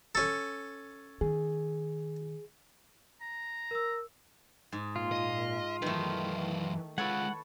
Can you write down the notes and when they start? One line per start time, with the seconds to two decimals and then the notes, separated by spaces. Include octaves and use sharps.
0.15 C#4 A4
1.21 D#3 G#4
3.22 A#5
3.71 A#4 E6
4.72 G#2
4.96 A#2 F4
5.12 D#5
5.82 F#2 D#3 E3 A3 B4
6.98 G#3 F4 A4 B4 C#5 F#5